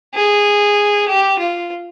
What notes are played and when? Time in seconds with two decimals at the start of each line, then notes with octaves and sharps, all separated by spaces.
0.14 G#4
1.08 G4
1.39 F4